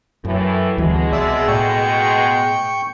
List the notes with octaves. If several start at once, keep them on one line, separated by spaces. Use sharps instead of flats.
F#2 A2 E3
D2 B2 E3 G3 G#3
C2 D5 E5
A2 G5 C#6